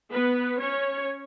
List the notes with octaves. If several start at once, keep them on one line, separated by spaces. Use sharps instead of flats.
B3 B4
C#4 C#5